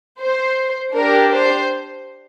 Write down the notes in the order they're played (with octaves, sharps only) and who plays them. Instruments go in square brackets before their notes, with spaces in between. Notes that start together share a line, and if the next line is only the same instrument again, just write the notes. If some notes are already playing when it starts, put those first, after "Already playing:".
[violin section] C5
D4 G4 A#4
C5